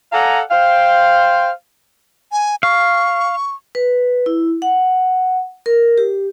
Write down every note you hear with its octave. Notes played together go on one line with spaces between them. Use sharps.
A4 D5 F5 F#5 G#5 A#5
C5 F5 G5
G#5
F5 C#6
B4
E4
F#5
A#4
G4